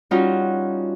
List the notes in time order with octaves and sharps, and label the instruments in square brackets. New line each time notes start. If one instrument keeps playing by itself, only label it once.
[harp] G3 C#4 D#4 F4 F#4